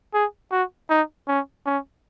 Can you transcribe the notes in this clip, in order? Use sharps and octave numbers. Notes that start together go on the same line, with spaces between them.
G#4
F#4
D#4
C#4
C#4